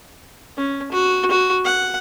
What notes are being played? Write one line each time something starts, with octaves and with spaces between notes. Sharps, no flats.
C#4
F#4
F#4
F#5